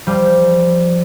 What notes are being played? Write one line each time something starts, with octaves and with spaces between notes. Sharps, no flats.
F3 G3 G4